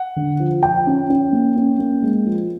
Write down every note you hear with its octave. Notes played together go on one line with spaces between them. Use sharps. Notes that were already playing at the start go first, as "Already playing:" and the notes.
Already playing: F#5
D3
F3
F3 G5
C#4
C#4
A#3
C#4
A#3
G#3
F3